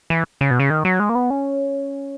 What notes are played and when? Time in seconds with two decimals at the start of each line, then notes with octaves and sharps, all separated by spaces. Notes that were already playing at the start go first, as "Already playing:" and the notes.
0.10 E3
0.41 C#3
0.51 B2
0.60 C#3
0.70 D#3
0.85 F#3
1.00 G#3
1.09 A#3
1.15 B3
1.30 C#4